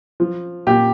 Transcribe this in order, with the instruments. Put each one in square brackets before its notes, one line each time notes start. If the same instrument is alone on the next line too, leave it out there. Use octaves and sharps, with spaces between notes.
[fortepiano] F3
[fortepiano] A#2 [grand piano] G4